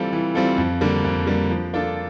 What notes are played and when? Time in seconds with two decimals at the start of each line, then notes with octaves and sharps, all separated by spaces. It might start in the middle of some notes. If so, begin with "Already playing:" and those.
Already playing: E3 G3 C4 F4 A4
0.13 E3
0.35 G3 C4 F4 A4
0.58 F2
0.81 D3 G3 A#3
1.04 F2
1.27 D3 G3 A#3
1.50 F3
1.73 A#3 D4 F4 A4